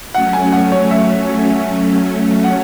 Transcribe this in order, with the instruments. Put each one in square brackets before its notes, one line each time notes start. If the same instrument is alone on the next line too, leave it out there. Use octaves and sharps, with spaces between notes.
[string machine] F#3 A3 C#4 [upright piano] F#5
[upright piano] G#5
F#5
C#5
E5
F#5